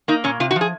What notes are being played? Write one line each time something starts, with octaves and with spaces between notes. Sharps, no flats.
A#3 D#4
A#2 C#4
C3 F4
F#4
F3
G#4